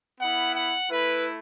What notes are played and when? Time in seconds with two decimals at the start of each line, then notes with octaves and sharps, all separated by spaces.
0.20 B3 E4 F#5
0.55 F#5
0.90 A3 E4 B4